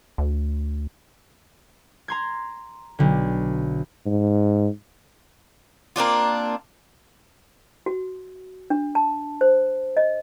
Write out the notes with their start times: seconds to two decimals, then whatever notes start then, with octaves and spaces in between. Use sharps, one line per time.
0.18 D2
2.08 A#5 C6 G#6
2.99 B1 D3
4.06 G#2
5.96 A#3 C4 D4 F4
7.86 F#4
8.70 D4
8.95 A5
9.41 C5
9.97 D#5